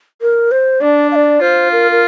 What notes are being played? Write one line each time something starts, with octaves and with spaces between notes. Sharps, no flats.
A#4
C5
D4 D5
F5
D5
F4 C5
A#4
A#4